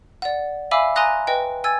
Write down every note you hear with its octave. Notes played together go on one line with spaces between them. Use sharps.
D5 F#5
E5 F5 G#5 B5 D6 E6
G#5 A#5 C6 D#6 F#6 A#6
B4 D#5 G5
G#5 E6 G#6 A6